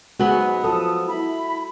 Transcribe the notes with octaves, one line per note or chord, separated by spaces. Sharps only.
G#2 F#3 G#3 B3 F#4 G#5
F3 A4 D#6
E4 B5